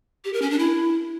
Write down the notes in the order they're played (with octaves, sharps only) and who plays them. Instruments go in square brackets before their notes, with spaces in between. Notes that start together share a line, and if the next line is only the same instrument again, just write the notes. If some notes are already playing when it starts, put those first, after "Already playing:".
[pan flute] G4
A#4
C#4
D4
E4